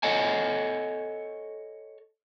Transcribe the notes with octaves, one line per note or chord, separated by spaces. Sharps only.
A4 C#5 D#5 F#5 G#5